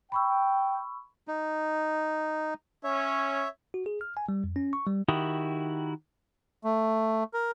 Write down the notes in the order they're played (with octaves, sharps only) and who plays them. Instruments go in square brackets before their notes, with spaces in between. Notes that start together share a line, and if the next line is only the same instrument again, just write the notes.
[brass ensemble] G5 [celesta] B5 C#6 E6
[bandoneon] D#4
[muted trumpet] C#4 [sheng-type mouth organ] C#5 E5
[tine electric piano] F#4
G#4
F6
G#5
G3
F2
C#4
C#6
G3
[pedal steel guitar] D#3 E4 F#4 G4 D#6
[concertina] A3
A#4